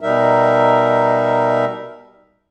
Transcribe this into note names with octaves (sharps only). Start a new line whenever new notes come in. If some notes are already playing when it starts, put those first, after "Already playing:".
B2 G3 D#4 A#4 E5